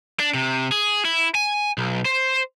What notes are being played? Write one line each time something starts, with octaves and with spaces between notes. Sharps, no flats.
D4
C3
G#4
E4
G#5
B1
C5